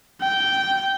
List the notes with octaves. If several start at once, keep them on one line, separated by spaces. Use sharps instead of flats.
G5